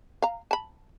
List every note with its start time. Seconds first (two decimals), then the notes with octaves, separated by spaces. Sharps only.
0.22 F5 A#5
0.51 A5 B5